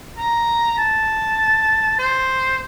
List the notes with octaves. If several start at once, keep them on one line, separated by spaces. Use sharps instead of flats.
A#5
A5
C5